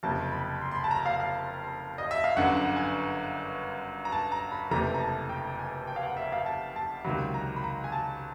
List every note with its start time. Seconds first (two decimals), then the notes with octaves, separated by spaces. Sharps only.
0.03 F#1 F2 C3 A5
0.32 B5
0.61 C6
0.71 C6
0.75 B5
0.84 A5
0.91 A#5
1.06 F5
1.20 F5
1.98 D#5
2.11 E5
2.24 F5
2.36 G1 F#2 D3 F#5
2.57 F#5
2.76 G#5
4.05 A#5
4.12 A5
4.32 A#5
4.52 B5
4.71 F#1 F2 C3 E3 A3 A#5
4.94 A#5
5.00 A5
5.29 G5
5.59 G#5
5.87 G5
5.96 F5
6.03 F#5
6.17 E5
6.32 F5
6.46 A5
6.76 A5
7.04 C#2 C3 D#3 F#3 B5
7.34 A#5
7.56 B5
7.64 A#5
7.84 G#5
7.92 A5